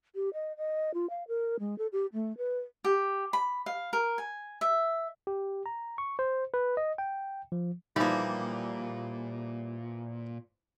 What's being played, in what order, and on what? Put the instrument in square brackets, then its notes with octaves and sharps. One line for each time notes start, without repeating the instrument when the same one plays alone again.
[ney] G4
D#5
D#5
F4
F5
A#4
G#3
A4
G4
A3
B4
[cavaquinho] G4
B5
F5
A#4
G#5
E5
[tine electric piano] G4
A#5
C#6
C5
B4
D#5
G5
F3
[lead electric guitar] A#2 [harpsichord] E3 F3 [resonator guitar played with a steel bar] G3 A#3 [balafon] D#4